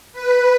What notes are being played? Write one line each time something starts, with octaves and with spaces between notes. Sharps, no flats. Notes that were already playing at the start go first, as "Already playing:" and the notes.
B4